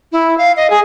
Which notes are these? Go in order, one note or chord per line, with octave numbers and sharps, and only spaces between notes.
E4
F5
D#5
G#4